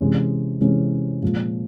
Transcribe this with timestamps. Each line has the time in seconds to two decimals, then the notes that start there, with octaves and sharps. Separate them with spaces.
0.01 C3 E3 G#3 C#4
0.61 C3 E3 G#3 C#4
1.22 A#2 F3 G#3